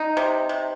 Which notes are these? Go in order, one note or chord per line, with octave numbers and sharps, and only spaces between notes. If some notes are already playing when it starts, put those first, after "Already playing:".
Already playing: D#4
C3
C3